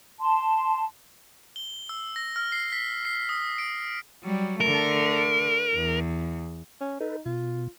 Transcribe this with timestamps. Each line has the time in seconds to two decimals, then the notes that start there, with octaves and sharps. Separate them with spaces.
0.20 A5 C6
1.56 G7
1.89 E6
2.16 A#6
2.36 F6
2.52 C7
2.72 B6
3.05 C7
3.29 D#6
3.58 D7
4.23 F#3 G3
4.61 D3 A3 A#4
5.75 E2
6.81 C#4
7.00 D#4 A4 B4
7.26 B2 F4